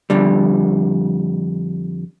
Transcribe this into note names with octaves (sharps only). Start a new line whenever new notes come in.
F2 D3 G3